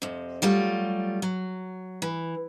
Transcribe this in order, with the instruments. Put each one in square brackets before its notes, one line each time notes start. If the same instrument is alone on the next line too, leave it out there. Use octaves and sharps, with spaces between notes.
[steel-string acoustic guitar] F2 C3
F#3 G3 A3 F4
F#3
E3